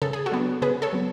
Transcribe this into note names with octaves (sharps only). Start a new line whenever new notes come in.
C#3 A4
G#4
F#4 A4
F#3 B3 D4
C#3 G#4 B4
A4 C#5
F#3 B3